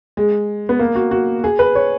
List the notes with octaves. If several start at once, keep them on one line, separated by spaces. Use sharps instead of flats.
G#3
B3
A#3
F#4
F#4
G#4
B4
C#5